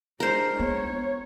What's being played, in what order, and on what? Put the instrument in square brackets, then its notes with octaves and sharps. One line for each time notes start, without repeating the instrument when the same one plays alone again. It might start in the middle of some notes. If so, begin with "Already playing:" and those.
[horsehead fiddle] G#3 D4 [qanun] A#4 C5
[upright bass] B3 [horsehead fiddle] C#5